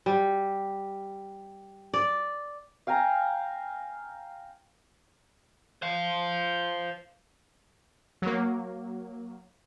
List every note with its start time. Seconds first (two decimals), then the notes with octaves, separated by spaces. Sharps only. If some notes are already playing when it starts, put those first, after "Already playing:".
0.06 G3
1.94 D5
2.87 F5 G5 G#5 A#5
5.82 C5 F5
8.22 F#3 A#3